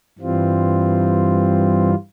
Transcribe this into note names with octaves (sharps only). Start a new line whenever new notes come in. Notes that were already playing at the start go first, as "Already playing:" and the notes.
G2 E3 G3 C4 F4